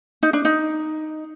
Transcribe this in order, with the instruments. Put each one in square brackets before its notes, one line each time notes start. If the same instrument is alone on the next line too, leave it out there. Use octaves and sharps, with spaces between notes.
[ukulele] D#4
D4
D#4